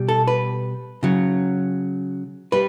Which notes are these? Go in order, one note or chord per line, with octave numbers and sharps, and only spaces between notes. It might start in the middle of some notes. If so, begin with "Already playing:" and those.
Already playing: B2 G3
A4
B4
C#3 F#3
G3 B4